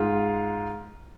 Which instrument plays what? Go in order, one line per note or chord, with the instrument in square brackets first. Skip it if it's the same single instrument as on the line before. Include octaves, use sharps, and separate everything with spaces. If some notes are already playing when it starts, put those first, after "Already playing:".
Already playing: [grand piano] G#2 G#3 F4